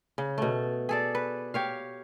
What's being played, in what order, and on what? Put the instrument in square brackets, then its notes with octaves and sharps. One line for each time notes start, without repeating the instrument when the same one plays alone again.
[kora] C#3
B2 A3
G#4 A4 D5
B4
G4 C#5 F5